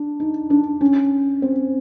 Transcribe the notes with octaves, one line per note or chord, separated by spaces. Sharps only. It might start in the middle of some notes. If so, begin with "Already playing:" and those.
Already playing: D4
D#4
D4
C#4
C4